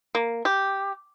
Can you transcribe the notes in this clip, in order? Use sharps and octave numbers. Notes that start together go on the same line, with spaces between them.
A#3
G4